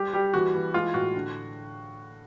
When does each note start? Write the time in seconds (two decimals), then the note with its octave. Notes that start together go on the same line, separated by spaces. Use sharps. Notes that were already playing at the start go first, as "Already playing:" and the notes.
Already playing: G3 G4
0.13 G3 G4
0.34 E3 F#4
0.55 E3
0.74 G#3 F4
0.94 A2 F#4
1.14 D3